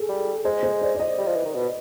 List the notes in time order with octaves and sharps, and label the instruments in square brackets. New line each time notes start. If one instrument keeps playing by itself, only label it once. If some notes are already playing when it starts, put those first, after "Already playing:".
Already playing: [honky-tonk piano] G#4 A4
[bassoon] G3
[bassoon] G#3 [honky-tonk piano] C5
[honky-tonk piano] C5
D5
D5
D#5
[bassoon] G3
F3
E3
D#3
B2